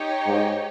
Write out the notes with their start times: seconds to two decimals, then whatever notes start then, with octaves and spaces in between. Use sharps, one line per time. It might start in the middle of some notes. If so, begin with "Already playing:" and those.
Already playing: D#4 G4 C#5
0.26 G#2